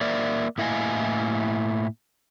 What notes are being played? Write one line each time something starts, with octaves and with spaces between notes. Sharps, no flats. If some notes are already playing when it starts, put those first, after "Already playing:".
A#3 A#4 D5 E5
A2 A#3 E4 D#5 F5 G#5